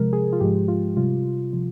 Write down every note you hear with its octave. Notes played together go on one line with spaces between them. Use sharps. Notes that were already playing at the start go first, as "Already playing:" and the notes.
Already playing: C3 F3 G#3 A#4
G#4
F4
G#2 F3 G#3 G4
F4
C3 G3 F4
C3 F3